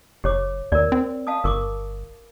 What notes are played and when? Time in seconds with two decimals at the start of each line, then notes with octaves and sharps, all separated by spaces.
0.24 F#1 G4 C#5 D6
0.72 D#2 A#4 D5
0.92 C4
1.27 F5 A5 D#6
1.44 G1 A#4 C#6 D6